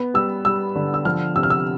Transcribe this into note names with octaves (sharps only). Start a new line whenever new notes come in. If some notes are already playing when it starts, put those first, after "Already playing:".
Already playing: B3
G3 E6
G3 E6
D3
E6
F3 F6
C3 E6
F6
E6